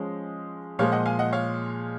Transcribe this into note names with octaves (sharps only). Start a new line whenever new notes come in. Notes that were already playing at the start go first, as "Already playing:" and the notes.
Already playing: F3 G#3 C#4
A#2 F3 G#3 C#5 F5
D#5 F#5
F5 G#5
D#5 F#5
C#5 F5